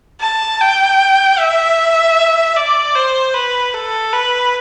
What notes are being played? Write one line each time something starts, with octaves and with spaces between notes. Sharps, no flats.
A5
G5
E5
D5
C5
B4
A4
B4